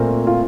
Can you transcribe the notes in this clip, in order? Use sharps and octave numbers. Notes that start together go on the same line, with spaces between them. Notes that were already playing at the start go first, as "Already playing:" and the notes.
Already playing: A#2 A3 C4 A#4
F4